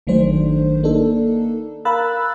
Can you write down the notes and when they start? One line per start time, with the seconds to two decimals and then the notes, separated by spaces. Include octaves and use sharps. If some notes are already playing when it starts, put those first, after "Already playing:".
0.07 A1 D#3 F#3 A3 D4 C5
0.83 A#3 D4 D#4 A4
1.85 A#4 F5 B5 E6 F#6 A6